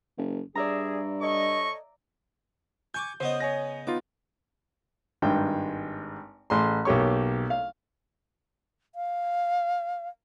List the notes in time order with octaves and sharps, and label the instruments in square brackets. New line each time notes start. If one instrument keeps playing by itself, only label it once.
[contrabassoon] F#1
[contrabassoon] G2 [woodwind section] G#4 [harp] D5 E5 A#5
[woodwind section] A4 C#5 D#5 [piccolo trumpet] C#6
[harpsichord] G#5 C#6 D6 [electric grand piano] G6
[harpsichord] C#3 B3 D#5 [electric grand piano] C5
[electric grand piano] C#5 G#5 A#6
[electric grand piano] B3 D#4 F4 [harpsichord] D6
[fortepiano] G#1 G2 G#3 G5
A1 G#4 C6
B1 A#3 G4 C#5 C#6
F5
[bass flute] F5